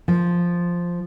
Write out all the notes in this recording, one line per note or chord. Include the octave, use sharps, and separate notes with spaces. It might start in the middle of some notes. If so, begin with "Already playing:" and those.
F3